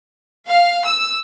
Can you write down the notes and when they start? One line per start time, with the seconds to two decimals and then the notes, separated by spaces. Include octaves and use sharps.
0.49 F5
0.85 E6